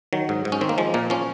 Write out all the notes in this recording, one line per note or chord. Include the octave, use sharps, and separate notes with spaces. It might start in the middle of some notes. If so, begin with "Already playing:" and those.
D#3 F#3
G#2
G#2
C#4
D#3 C4
A#3
F3 G#3
A#2 A#3
F3 C#4